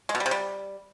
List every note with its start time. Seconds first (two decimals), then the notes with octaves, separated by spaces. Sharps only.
0.09 G#3
0.15 B2
0.20 G3
0.26 C3
0.31 G3